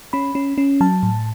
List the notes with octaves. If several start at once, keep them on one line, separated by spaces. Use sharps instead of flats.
C#4 B5
C#4
C#4
F#3 A5
A2